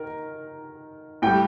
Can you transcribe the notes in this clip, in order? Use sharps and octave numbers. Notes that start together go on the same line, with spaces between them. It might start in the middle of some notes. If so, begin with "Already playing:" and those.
Already playing: D#3 A#4
A2 G3 G5